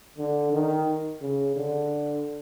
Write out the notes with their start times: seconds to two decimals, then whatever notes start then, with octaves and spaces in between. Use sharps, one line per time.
0.18 D3
0.53 D#3
1.21 C#3
1.56 D3